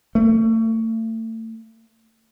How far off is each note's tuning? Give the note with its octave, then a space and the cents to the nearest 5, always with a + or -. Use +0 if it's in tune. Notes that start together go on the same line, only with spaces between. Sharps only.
A3 +35